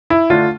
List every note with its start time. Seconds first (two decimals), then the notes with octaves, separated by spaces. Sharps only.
0.10 E4
0.30 D3 A3 D4 F4